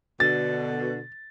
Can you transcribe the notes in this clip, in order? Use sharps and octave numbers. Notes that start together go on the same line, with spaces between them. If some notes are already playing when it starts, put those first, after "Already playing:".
B2 D3 A6